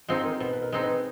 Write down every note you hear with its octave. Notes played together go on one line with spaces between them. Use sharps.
G#3 C4 D#4 F4
A#4
B2 B4
B4
A#4
G#3 C4 D#4
B4